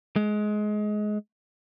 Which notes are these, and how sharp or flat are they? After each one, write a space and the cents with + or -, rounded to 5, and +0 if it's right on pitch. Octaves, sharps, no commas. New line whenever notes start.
G#3 +20